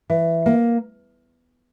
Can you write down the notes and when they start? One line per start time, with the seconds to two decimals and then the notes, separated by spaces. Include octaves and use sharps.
0.10 E3
0.46 A#3